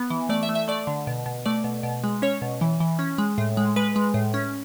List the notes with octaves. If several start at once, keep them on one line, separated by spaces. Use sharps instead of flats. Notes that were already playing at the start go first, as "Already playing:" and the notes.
Already playing: B3
E3
A3 D5
E5
A3
E5
A3 D5
D3
B2
B2
A3 D5
B2
B2
G#3
C#4 C#5
B2
E3
E3
C#4
G#3
A2
G#3
G#3 B4
G#3
A2
C#4